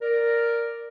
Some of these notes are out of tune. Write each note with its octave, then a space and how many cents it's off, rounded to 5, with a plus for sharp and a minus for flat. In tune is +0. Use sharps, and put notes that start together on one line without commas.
A#4 +0 D5 +0